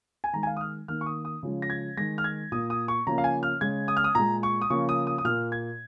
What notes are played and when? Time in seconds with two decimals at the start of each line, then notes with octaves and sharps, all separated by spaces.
0.24 G#5
0.33 D#3 G#3 A#5
0.43 G#5
0.47 F5
0.57 D#6
0.61 F6
0.88 D#3 A#3 F6
1.01 C#6
1.06 D#6
1.25 D#6
1.43 C#3 F3 G#3
1.62 A#6
1.70 G#6
1.97 D#3 G#3 A#6
2.18 F6
2.24 G#6
2.52 A#2 A#3 D#6
2.70 D#6
2.88 C#6
3.07 C#3 F3 A#3 A#5
3.18 F5
3.24 G#5
3.43 F6
3.61 C#3 G#3 G#6
3.88 D#6
3.97 F6
4.04 D#6
4.15 A#2 G#3 A#5
4.43 C#6
4.61 D#6
4.70 C#3 F3 A#3 C#6
4.89 D#6
5.07 D#6
5.18 D#6
5.25 A#2 A#3 F6
5.52 G#6